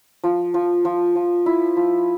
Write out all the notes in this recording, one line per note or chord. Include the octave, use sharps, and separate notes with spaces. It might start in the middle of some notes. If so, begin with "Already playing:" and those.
F3
F3
F3
F3
E4
F3